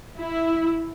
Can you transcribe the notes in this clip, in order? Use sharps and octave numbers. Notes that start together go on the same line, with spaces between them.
E4